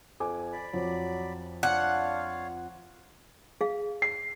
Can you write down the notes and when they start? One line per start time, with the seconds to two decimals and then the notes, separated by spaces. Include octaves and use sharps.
0.20 F2 G#5 D6
0.53 D5 B5
0.74 F2 F#3
1.63 D4 F4 C#5 F5 F#5
3.61 G#4 F5
4.02 C7